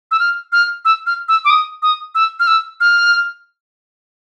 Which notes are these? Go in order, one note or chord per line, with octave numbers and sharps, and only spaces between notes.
E6
F6
F6
E6
F6
E6
D6
D#6
D#6
E6
F6
E6
F6